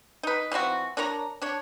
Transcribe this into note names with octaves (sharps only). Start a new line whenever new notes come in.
D#4 B4
E3 F3 C4 F#4
D4 A#4 C#5 A#5
D4 C#5